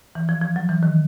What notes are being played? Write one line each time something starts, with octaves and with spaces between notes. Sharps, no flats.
E3
F3
F3
F#3
E3
D#3